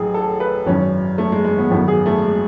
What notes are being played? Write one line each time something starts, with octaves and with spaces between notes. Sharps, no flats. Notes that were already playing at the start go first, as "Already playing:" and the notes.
Already playing: A1 A2 F#3 G#4
A4
B4
G#1 F#2 E3 C#4
A3
G#3
G#3
B3
G#1 F#2 E3 B3
G#4
A3
G#3